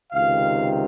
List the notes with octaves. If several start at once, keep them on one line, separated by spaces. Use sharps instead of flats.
C#2 C3 D#3 F5